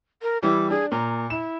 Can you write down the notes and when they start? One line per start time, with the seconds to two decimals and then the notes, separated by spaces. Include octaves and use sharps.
0.22 A#4
0.43 E3 G3 E4 D6
0.70 D4 G#4
0.92 A#2 A#5
1.30 E4 E7